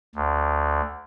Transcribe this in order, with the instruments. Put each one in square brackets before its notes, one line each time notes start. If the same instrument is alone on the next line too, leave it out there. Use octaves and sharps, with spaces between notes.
[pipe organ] D2